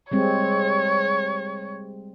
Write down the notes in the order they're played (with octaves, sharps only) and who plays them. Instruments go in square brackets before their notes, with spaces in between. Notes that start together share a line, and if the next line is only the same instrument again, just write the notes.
[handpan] G3 G#3 C4 [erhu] C#5